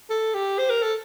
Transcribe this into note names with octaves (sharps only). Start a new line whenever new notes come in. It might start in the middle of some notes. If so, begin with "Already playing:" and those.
A4
G4
C5
A#4
A4